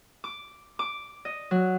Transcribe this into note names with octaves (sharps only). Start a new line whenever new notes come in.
D6
D6
D#5
F#3